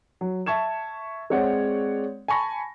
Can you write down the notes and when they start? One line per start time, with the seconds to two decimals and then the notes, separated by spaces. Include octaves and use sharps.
0.21 F#3
0.46 E5 A5 C#6 G#6 E7
1.30 G#3 C4 C#5 D5 F#5
2.28 G#5 A5 B5 C#6 A#6